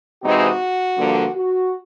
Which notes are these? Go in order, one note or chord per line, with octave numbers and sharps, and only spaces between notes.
C3 E3 G#3 C4 D#4 F#4
G2 D3 F3 A#3
F#4